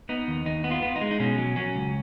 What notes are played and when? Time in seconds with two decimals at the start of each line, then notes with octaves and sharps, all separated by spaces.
0.09 B3 D#4
0.28 D#2
0.46 D#2 D#4
0.64 B3
0.71 F4
0.82 B3
0.96 D#4
1.01 G#3
1.11 D#4
1.20 B2 C#4
1.38 F#3
1.56 F#3 C#4
1.76 C#2